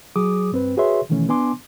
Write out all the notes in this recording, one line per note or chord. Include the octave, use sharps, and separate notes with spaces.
F#3 G#4 D6 D#6
G2 C4 B4
F#4 G#4 B4 C#5 E5 C6
B2 D#3 E3 A3 C#4
B3 D4 G#5 C6 D6